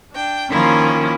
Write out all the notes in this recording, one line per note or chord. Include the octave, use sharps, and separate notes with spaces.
D4 G5
D#3 F3 A#3 C#4 E4 F4